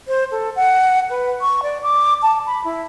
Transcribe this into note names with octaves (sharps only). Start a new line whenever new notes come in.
C5
A4
F#5
B4
C#6
D5
D6
A5
B5
E4